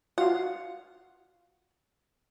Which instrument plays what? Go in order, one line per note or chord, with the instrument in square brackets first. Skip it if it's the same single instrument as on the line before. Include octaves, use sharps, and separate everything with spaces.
[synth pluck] F4 F#4 F5 [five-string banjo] F#5